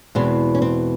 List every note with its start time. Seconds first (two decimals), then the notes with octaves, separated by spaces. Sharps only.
0.15 E2 B2 G#3 C4
0.55 C#4
0.62 C4